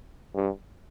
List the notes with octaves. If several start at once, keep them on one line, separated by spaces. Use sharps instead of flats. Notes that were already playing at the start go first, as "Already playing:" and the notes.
G2